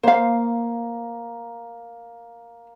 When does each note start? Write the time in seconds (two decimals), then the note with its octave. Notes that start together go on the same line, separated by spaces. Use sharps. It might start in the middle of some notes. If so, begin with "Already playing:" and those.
0.03 A#3 C5 F5